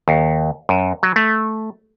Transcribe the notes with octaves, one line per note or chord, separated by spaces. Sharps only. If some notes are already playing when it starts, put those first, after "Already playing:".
D#2
F#2
F#3
A3